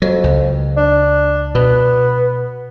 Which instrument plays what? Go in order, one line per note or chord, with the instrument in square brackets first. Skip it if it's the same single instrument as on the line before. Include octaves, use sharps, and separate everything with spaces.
[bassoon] F2 [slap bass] F#3
[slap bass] C#2
[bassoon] D4
[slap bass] B2 [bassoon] B3